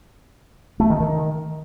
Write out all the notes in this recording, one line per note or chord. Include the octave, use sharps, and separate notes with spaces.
A3
D#3
D#3